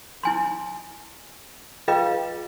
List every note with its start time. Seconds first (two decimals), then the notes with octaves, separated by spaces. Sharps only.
0.23 E4 G#5 C6
1.88 F4 G#4 B4 D#5 F5 G5